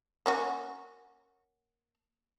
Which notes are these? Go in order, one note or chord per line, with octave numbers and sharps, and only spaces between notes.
A#3 C#4 F#4